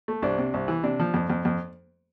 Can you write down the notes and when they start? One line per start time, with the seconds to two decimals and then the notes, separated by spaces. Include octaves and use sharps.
0.08 A3
0.22 C2 D4
0.38 C3
0.54 C2
0.68 E3
0.83 C3 D4
1.00 F3
1.14 F2
1.30 F2
1.45 F2